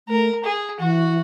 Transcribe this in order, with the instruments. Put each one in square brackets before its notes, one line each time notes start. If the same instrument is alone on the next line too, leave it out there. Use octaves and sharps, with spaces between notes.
[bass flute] A3 [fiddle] A#4
[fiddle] G#4
[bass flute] E3 [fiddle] F#4